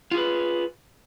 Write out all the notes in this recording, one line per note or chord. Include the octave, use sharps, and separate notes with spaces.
F4 G#4 B4